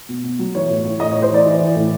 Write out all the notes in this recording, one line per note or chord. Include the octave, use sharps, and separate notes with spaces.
B2
B2
F#3
E3 C#5
A2
A2
A2 D#5
A2 C#5
C5
E3 D5
E3
E3
A2